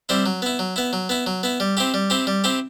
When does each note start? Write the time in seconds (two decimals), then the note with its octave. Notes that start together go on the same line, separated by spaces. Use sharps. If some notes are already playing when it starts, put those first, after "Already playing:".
0.09 G3 C4 E4
0.26 F#3
0.42 B3 E4
0.59 F#3
0.76 B3 E4
0.93 F#3
1.09 B3 E4
1.26 F#3
1.43 B3 E4
1.60 G3
1.77 C4 E4 G4
1.94 G3
2.10 C4 E4 G4
2.27 G3
2.44 C4 E4 G4